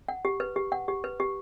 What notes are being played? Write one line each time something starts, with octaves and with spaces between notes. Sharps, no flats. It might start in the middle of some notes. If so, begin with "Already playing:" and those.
F#5
G4
B4
G4
F#5
G4
B4
G4